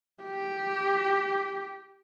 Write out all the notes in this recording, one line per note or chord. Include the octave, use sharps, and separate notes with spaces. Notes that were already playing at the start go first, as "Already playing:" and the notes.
G4